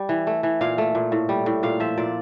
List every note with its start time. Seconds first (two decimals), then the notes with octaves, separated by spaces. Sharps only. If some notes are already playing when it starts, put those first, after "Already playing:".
Already playing: G3
0.09 E3
0.27 A3
0.43 E3
0.61 A#2 F5
0.78 A3
0.95 A#2
1.12 A2
1.29 G3
1.46 A2
1.63 A#2 F5
1.80 F3 E5
1.97 A#2 D5